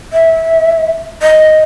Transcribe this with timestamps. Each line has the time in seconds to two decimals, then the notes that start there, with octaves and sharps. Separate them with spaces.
0.13 E5
1.22 D#5